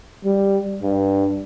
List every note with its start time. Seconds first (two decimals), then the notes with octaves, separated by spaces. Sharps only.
0.25 G3
0.83 G2